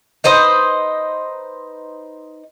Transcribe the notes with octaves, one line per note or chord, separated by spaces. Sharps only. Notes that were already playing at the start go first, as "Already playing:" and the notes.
D#4 B4 C5 D#5